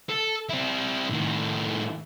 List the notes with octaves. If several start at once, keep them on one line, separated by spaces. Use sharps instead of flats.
A4
C4 E4
A2 D#3